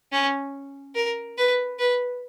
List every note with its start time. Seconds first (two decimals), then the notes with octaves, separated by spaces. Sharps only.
0.12 C#4
0.95 A#4
1.38 B4
1.79 B4